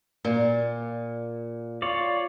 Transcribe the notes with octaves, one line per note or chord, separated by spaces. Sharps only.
A#2
F4 C#5 D5